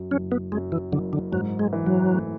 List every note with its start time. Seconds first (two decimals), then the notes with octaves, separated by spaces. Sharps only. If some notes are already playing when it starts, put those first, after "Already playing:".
Already playing: F#2
0.11 F#1 C#4
0.32 B3
0.52 F#2 G#3
0.72 E3
0.92 F#1 D3
1.13 D3
1.32 G#2 F#3
1.59 G#3
1.73 E3
1.86 F#3
2.14 A3